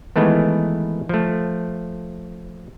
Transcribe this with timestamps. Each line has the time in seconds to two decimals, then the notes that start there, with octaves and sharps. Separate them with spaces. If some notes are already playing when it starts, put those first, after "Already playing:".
0.16 D#3 E3 G#3 A3 B3
1.09 F3 A3